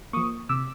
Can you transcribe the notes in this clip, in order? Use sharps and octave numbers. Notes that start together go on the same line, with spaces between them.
F3 A#3 C#6 D#6
C3 D6 E6